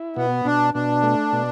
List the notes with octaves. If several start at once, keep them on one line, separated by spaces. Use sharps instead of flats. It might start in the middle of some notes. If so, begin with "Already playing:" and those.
Already playing: E4
B2 B3
B2 D4
B2 D4
A3
B2